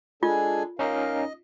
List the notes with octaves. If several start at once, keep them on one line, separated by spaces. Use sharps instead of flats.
G#3 D4 F4 G#4 A4 G#5
C#4 D#4 A#4 D#5 F5